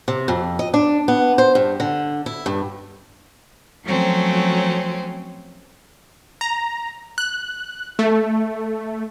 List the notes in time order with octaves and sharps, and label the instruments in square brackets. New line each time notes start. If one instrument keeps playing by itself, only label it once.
[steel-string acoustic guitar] C3
F2
D#5
D4
B3
C5
G2
D3
E4
G2
[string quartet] F3 F#3 A3 C4 C#4
[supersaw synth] A#5
F#6
A3